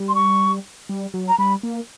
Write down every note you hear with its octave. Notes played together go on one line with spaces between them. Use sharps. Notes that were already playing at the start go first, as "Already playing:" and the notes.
Already playing: G3
C6
C#6
G3
F#3
A#5
G3 B5
A#3